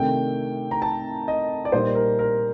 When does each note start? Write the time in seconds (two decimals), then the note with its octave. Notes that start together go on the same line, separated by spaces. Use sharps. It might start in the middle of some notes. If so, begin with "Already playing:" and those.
Already playing: C3 D#3 A3 D4 G5
0.71 A#5
0.82 A5
1.28 D#5
1.65 D5
1.72 A#2 G3 A#3 D#4 C5
1.95 A#4
2.19 A#4